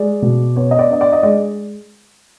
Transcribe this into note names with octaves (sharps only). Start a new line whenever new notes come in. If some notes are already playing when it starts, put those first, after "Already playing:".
Already playing: G#3 D5
B2
B3 C#5
D#5
D5
D4 D#5
D5
D#5
G#3 D5